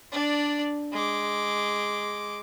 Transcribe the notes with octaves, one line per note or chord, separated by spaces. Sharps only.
D4 D5
G#3 D6